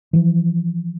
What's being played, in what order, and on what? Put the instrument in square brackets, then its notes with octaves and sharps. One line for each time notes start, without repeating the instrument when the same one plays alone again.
[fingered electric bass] E3 F3